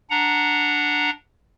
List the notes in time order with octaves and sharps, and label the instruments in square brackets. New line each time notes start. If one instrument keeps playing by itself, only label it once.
[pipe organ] D4 F#5 A#5